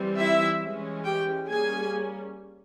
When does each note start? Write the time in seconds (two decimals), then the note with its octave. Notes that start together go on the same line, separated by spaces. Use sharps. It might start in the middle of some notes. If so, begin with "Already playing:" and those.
Already playing: E3 G3 C4
0.18 E4 E5
0.62 E3 G#3 C#4
1.04 G4 G5
1.48 G3 A#3 C#4 G#4 G#5